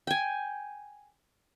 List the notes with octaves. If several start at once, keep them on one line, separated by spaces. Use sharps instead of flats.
G5 G#5